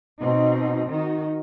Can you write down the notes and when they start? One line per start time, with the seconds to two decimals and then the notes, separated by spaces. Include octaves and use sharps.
0.19 B2 C4 D#4
0.89 D#3 D#4 F#4